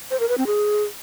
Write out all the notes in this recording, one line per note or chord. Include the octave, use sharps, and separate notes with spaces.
C5
A#4
B4
C4
G#4